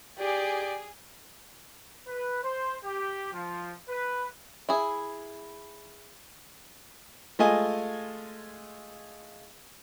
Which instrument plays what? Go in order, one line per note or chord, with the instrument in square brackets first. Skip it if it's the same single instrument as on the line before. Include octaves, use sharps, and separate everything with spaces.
[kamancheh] G4 D5 [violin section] G#4
[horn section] B4
C5
G4
F3
B4
[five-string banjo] E4 G#4
[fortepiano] G#3 A3 F4 D#5 G#5